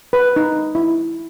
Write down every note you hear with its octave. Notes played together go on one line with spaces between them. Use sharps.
B4
D#4
E4